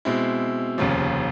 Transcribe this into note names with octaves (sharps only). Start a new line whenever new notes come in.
B2 G#3 C4 E4
F1 D#2 C#3 F3